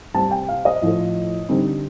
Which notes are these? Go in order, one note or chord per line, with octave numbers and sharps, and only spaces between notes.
C3 G3 C4 A5
G5
F5
D#5
A2 F3 A3
D3 G3 C4 D#4